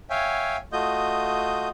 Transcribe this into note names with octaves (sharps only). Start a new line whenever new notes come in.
C#5 E5 F5 G5 G#5
A3 F4 F#4 D#5 D#6 G6